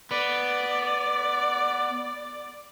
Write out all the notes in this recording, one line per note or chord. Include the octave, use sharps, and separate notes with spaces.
B3 D5